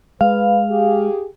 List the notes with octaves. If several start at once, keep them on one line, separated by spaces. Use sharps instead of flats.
G#3 B4 F5
G4 G#4